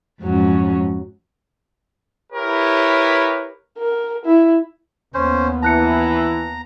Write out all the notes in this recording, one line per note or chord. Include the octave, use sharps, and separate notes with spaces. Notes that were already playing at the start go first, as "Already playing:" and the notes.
F2 G#2 F#3 C#4
E4 G4 A#4 B4 C#5
A#4
E4
D#2 B3 C#4 C5
E3 A5 A#5 F#6 C#7